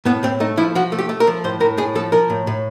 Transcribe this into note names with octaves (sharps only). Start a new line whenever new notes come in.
A2 B3
A2 C4
A3 D#4
F3 E4
F3 F#4
A3
G4
A3
A#4
F3
A2 C5
A2 A#4
A2 G#4
F3 A4
F3 A#4
A2
A2